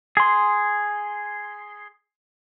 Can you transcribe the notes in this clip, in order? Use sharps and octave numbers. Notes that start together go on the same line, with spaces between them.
G#4 C6